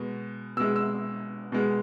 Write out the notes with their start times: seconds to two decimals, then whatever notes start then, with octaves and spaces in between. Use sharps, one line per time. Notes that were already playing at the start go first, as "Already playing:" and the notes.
Already playing: B2 G#3
0.57 B2 G#3 E6
0.76 E6
1.52 B2 G#3